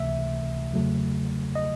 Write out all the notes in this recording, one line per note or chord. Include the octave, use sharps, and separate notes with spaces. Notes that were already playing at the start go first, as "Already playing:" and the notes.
Already playing: C#2 C3 E3 A3 E5
E2 C#3 F#3 A3
D#5